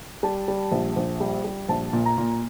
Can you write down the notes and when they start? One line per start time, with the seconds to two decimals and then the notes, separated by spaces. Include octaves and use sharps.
0.23 G3 A5
0.48 G3
0.72 A#1
0.96 A#1
1.21 G3
1.45 G3
1.69 A#1 A5
1.93 A#2
2.06 A#5
2.18 A#2